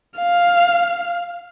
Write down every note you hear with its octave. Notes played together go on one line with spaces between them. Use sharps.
F5